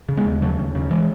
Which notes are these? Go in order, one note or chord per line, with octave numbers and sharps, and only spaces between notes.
C#3
G#3 B3
D#2
C#3 F#3 A3
D#2
C#3
E3 G#3